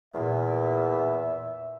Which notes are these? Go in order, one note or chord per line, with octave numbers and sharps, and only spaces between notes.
E2 A#2 E5